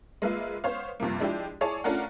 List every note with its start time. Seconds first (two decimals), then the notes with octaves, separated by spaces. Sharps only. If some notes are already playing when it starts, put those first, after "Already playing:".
0.22 G#3 A#3 F4 B4 E5
0.64 B3 C5 C#5 F5
1.00 G2 C3 F3 A#3
1.20 F3 G#3 D4 E4 G4
1.61 E4 G#4 C#5 D5 A5
1.84 A3 C#4 D4 F4 A#4 F#5